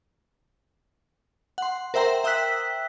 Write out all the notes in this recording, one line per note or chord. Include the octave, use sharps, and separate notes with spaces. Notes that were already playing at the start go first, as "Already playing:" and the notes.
F#5 C6
A#4 C5 E5 G5 A#5 C6
E5 G5 D#6 E6 F#6 B6